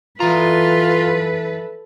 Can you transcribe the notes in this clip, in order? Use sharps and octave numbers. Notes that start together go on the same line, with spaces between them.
E3 F4 A4 B4 A#5